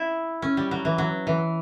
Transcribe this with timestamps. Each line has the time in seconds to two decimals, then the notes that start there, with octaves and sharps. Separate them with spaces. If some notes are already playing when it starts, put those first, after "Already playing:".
Already playing: E4
0.42 C#4
0.57 G3
0.71 F#3
0.85 E3
0.98 F#3
1.27 E3